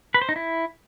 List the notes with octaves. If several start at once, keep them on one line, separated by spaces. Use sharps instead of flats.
B4
C5
D#4
E4